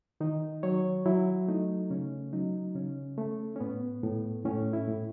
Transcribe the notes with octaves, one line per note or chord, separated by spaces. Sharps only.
D#3 D#4
F#3 C#5
F#3 E4
A3 D#4
C#3 C#4
F#3 D#4
C#3 C#4
A3
C#4
A2 B3
A2
A2 C#4
E4
A2